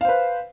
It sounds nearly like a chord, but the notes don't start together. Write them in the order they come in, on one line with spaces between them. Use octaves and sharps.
F5 C5 B4